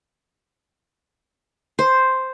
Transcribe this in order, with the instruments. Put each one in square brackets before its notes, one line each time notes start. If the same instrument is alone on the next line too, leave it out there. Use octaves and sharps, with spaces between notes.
[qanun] C5